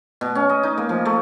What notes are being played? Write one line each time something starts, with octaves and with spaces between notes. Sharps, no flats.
B2
C#4
D#5
D#4
A#3
F3
A3